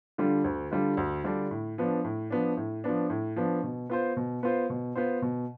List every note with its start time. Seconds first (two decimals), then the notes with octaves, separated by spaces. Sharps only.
0.18 D3 G3 D4 F4
0.44 D2
0.71 D3 G3 D4 F4
0.97 D2
1.24 D3 G3 D4 F4
1.51 A2
1.78 F3 B3 D4
2.04 A2
2.30 F3 B3 D4
2.57 A2
2.84 F3 B3 D4
3.10 A2
3.36 F3 B3 D4
3.63 B2
3.90 B3 F4 C5
4.17 B2
4.43 B3 F4 C5
4.70 B2
4.96 B3 F4 C5
5.22 B2